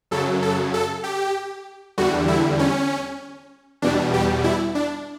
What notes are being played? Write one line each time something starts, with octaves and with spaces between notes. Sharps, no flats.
F#2 C#3 F#3 A4
A4
A4
G4
E2 D3 G3 F#4
E4
C#4
E2 B2 G3 D4
G4
E4
D4